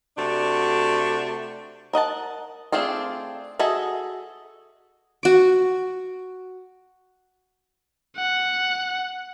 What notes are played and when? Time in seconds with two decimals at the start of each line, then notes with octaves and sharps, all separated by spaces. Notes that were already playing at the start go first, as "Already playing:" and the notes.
0.17 C3 A3 D4 F#4
1.93 A#4 D#5 F#5 A5
2.72 A3 C4 D4 F4 G#4
3.59 F#4 G#4 A4 D#5 E5
5.23 F#4 D6
8.17 F#5